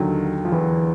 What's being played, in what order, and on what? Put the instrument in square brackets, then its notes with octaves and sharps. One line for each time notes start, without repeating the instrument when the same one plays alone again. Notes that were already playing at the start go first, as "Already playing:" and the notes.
Already playing: [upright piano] D#2 D3 F#3 [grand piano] D#3
[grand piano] F3
E2 E3